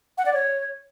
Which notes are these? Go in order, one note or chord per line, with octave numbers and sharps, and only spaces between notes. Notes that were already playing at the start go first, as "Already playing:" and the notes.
F#5
D5
C#5